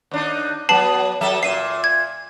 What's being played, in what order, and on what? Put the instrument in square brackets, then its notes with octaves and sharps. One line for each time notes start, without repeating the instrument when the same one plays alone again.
[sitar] D#2 D4 D#4
[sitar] F#3 B3 [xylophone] A5 C7 F#7
[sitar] F#3 A4 E5
[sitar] A#2 E5 [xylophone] C7 D#7
[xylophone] G#6